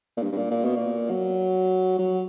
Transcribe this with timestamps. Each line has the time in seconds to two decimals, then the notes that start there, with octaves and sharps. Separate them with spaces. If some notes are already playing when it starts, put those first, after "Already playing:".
0.17 A#2
0.22 G2
0.32 G2
0.37 A#2
0.51 A#2
0.64 B2
0.77 A#2
1.10 F#3
1.99 F#3